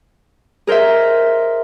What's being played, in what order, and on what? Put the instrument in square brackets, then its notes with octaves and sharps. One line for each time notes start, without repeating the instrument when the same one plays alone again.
[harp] G#4 A#4 C5 D#5 E5